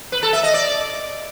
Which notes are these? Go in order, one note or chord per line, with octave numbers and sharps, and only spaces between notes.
B4
A4
E5
D#5
D5